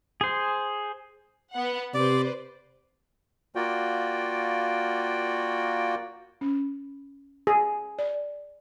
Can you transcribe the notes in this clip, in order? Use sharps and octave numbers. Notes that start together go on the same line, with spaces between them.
G#4 C5
B3 F#5
C3 B4 C5 D5
A#3 F4 F#4 D5 G5
C#4
G#4
D5